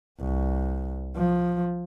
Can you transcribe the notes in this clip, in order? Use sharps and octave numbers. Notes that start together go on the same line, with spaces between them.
C2
F3